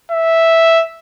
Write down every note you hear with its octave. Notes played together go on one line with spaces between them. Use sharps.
E5